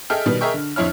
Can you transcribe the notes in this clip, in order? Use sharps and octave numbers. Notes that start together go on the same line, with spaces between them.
G#4 A4 D#5 E5 G5 F6
B2 D#3 G3 B3
G#4 A#4 D#5 E5 G5 C#6
D3
F2 D3 E4 C#5 F6